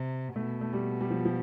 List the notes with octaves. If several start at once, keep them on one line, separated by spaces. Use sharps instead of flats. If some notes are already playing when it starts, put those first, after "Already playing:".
Already playing: C3
B2 A3
A3
G3
G3
F3
F3